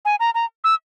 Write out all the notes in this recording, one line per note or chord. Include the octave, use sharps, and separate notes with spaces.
G#5
A#5
A#5
E6